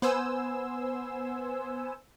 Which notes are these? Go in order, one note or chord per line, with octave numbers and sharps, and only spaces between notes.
B3 C5 G#5 E6